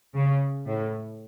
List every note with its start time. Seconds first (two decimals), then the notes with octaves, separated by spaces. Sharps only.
0.14 C#3
0.66 A2